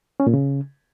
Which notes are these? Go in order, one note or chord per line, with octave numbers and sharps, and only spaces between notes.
C#4
A#2
C#3